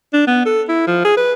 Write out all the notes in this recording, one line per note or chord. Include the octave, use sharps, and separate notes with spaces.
D4
B3
A4
E4
F3
G#4
B4